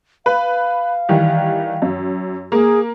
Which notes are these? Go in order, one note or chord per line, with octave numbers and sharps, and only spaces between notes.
B4 F5
D#3 E3 G3
F#2
A#3 G#4